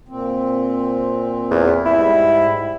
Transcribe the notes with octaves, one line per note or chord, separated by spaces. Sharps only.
A#2 C4
E2
G#2 G3 E4